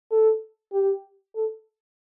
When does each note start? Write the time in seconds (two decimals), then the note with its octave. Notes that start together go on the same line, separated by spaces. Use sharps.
0.11 A4
0.73 G4
1.35 A4